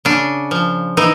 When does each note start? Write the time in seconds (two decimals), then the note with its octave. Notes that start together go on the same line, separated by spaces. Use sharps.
0.05 C#3 D4
0.51 F3
0.97 E3 D#4